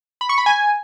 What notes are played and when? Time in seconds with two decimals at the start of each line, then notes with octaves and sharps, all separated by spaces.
0.21 B5
0.29 C#6
0.38 B5
0.46 G#5